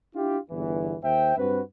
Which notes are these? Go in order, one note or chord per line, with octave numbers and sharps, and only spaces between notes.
D4 E4 F4 G4
G1 E2 E3
D#2 C5 E5 G5
G2 C4 F#4 B4